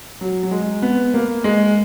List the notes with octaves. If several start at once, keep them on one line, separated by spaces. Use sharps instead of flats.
F#3
F#3
G#3
B3
A#3
G#3